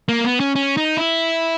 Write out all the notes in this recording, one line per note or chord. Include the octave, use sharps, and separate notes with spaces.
A#3
B3
C#4
C#4
D#4
E4